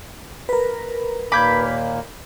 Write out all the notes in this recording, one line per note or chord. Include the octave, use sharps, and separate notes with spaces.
A#4 B4
D#2 A#2 A#3 B5 D6 G6 G#6